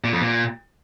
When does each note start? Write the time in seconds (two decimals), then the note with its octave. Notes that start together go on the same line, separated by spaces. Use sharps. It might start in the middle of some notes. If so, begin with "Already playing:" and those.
0.04 A#2
0.13 F2
0.22 A#2